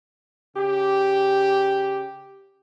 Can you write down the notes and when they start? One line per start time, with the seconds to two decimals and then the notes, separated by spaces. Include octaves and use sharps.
0.56 C#3 G4